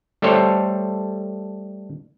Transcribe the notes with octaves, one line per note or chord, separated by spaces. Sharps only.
G3 A3 A4 C5 C#5